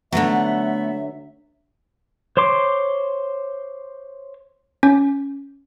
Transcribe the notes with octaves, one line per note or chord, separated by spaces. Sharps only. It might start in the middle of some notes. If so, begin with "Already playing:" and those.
D3 F#3 A3 B3 E5
C5 C#5 C6 D6
C#4